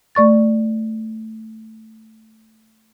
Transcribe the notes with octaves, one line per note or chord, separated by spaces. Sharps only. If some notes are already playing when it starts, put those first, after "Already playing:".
A3 D5 C#6 A6